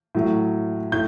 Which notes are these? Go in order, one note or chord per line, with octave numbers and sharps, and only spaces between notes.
A2 F#3
A2 G6